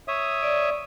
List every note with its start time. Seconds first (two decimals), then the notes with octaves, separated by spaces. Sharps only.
0.08 C#5 E5 D#6
0.43 D5